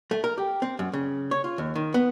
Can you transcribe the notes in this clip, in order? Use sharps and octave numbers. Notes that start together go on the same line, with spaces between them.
A3
A#4
G4
C4
F#2
C#3
C#5
F4
D#2
D#3
B3